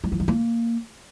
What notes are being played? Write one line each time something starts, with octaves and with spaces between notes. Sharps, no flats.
G3
F3
F#3
A#3